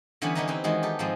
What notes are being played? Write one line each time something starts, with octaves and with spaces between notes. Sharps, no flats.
D3 E3 G3 B3 C#4 B4
D3 E3 C#4 D#4 E4 A#5
C4 D#4 B4
D#3 E3 G#3 B3 F#4
D#4 G4 A4
G#2 F3 G#3 C4